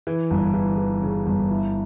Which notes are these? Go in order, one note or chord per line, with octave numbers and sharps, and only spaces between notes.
E3
G1
E3
E3
C#3
G1
E4